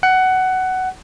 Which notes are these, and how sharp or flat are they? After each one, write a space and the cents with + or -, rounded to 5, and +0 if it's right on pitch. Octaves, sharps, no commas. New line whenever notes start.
F#5 +15